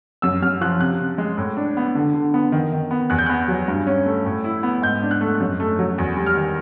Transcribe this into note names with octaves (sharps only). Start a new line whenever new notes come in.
F#2 E6
F#2 F6
F3 F#6
C3 F#6
C3
G#3
A2
D4
B3
D3
D3
B3
D#3
D#3
B3
E2 F#6
G6
B3 F#6
F#3
G2
C#4
A3
A2
E4
B3
G#2 G6
D4
F#6
A3
F#2
A3
F#3
E2
G3
F6
D#3